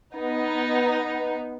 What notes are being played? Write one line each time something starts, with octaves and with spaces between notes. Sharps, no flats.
B3 D#4